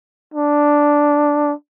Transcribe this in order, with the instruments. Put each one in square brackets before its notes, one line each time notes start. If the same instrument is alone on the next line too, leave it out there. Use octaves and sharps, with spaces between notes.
[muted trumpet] D4